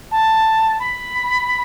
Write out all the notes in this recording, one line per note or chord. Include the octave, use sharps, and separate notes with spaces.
A5
B5